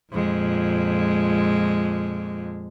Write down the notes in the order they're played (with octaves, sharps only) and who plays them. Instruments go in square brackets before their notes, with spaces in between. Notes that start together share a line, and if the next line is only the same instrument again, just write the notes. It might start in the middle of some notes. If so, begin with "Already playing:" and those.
[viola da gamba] F2 A#2 G#3